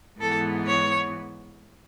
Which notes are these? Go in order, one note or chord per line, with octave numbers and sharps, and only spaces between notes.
G#2 E3 B3 A4
C#5